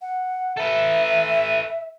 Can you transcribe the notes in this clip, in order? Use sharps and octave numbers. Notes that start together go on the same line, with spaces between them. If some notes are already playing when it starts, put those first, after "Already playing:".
F#5
A4 B4 E5